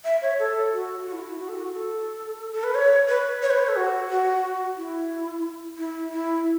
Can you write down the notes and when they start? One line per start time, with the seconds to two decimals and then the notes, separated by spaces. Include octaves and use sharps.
0.05 E5
0.22 C#5
0.39 A4
0.73 F#4
1.06 F#4
1.13 E4
1.27 E4
1.39 F#4
1.49 A4
1.57 F#4
1.74 A4
2.53 A4
2.64 B4
2.75 C#5
3.08 B4
3.42 C#5
3.50 B4
3.59 C#5
3.68 A4
3.76 F#4
4.10 F#4
4.77 E4
5.78 E4
6.13 E4